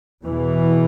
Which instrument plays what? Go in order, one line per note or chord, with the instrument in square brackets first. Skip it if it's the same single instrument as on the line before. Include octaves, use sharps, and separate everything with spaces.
[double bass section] E2 B2 E3